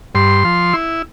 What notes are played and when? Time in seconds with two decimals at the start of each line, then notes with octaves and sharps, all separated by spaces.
0.15 G2 C6
0.45 F3
0.73 E4